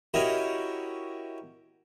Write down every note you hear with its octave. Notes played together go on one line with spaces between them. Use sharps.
C#4 E4 F#4 G4 A#4 D#5